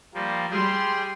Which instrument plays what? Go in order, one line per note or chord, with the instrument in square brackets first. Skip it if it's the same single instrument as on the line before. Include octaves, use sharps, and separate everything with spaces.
[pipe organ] F3 G3 A#3
[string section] G3 C6 [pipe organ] G#4 G5